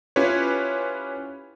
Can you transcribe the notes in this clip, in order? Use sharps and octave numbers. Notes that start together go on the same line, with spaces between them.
C#4 E4 F4 G4 B4 C#5